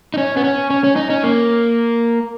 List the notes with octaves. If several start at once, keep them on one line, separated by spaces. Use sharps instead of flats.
D#4
C#4
B3
C#4
C#4
C#4
D#4
C#4
A#3